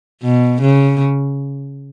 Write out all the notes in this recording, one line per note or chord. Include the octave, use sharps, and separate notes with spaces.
B2
C#3